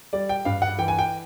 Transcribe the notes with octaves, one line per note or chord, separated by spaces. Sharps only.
G3 D5
G5
G2 F5
F#5
E3 G5
G#5
G5